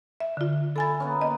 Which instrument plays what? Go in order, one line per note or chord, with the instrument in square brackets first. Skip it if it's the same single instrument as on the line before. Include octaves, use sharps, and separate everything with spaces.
[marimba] E5
D3 F4
[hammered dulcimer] E4 [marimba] A4 G#5 A6
[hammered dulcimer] A#3 B3 C#4
[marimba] D#5